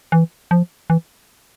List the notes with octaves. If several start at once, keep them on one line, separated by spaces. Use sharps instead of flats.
E3
F3
E3